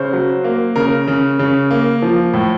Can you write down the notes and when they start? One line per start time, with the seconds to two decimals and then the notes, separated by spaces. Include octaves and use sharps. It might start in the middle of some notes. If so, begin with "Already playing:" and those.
Already playing: C#3 C5
0.13 F#3
0.44 A#3
0.76 C#3 A#4
1.08 C#3
1.39 C#3
1.71 A#3
2.02 F3
2.34 A2